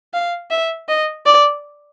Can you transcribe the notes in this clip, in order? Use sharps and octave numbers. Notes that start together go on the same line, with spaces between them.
F5
E5
D#5
D5